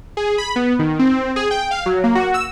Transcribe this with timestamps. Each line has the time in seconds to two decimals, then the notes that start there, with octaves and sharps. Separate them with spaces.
0.17 G#4
0.38 B5
0.56 B3
0.79 D#3
0.99 C4
1.36 G#4
1.51 G5
1.71 F5
1.86 F#3
2.04 A#3
2.15 F#4
2.34 E6